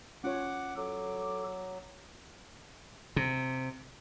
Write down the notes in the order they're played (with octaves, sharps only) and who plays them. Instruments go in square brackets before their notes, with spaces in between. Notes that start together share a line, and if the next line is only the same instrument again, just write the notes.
[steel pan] C#4 F4 C#5 [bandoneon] F#5 D6
[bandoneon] F#3 [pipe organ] A4 [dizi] D6
[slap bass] C3